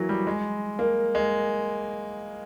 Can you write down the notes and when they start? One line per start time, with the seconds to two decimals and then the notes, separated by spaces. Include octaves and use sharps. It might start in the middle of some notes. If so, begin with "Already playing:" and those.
Already playing: E3 F#3 A#3
0.09 G3
0.27 G#3
0.79 A#3
1.15 G#3